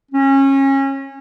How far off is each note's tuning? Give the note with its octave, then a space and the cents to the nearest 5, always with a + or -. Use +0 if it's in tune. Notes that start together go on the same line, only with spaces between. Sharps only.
C#4 -25